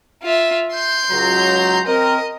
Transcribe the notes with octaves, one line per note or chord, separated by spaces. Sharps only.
F4 E5
C6 G6
C#2 F#3 A#5
C4 A#4 D#5